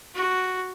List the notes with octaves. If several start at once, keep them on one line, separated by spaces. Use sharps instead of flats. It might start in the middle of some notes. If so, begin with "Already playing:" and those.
F#4